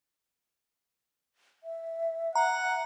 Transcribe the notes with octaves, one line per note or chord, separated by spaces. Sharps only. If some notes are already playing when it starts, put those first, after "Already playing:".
E5
F#5 A#5